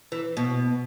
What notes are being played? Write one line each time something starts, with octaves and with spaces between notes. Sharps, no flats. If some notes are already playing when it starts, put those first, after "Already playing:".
E3
B2